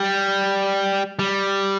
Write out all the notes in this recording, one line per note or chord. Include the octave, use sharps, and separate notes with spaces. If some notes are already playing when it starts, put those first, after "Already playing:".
Already playing: G3
G3